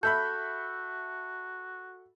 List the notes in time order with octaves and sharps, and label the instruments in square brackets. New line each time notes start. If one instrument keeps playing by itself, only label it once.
[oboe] F#4 [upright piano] A4 E5 B5 [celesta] G6